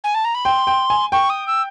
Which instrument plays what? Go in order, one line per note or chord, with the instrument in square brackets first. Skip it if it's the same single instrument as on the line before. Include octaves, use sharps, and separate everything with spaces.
[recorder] G#5
A5
A#5
B5
[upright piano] G5 [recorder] C6
[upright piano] G5
G#5
[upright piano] G5 [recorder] C#6
[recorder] D#6
E6